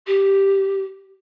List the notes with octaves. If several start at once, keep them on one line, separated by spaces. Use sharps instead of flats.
G4